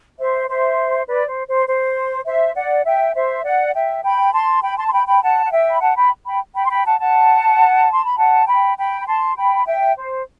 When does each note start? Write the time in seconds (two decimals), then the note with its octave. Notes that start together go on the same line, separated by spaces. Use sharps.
0.18 C5 E5
0.48 C5 E5
1.07 B4 D5
1.27 C5
1.47 C5
1.67 C5
2.25 C5 E5
2.55 D5 F#5
2.85 E5 G5
3.15 C5 E5
3.44 D5 F#5
3.74 E5 G5
4.03 G5 B5
4.33 A5 C6
4.63 G5 B5
4.77 A5 C6
4.87 C6
4.92 G5 B5
5.07 G5 B5
5.22 F#5 A5
5.44 F#5
5.51 E5 G5
5.71 B5
5.81 F#5 A5
5.96 G5 B5
6.26 G5 B5
6.55 G5 B5
6.66 C6
6.70 G5 B5
6.85 F#5 A5
6.99 F#5 A5
7.92 C6
8.05 B5
8.18 F#5 A5
8.47 G5 B5
8.77 G5 B5
9.00 B5
9.06 A5 C6
9.36 G5 B5
9.66 E5 G5
9.96 C5